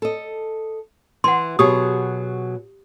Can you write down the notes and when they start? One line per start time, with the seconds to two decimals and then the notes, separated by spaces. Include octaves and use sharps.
0.02 A4 D#5
1.24 E3 F#5 C6
1.59 B2 F#3 G4 G#4 D#6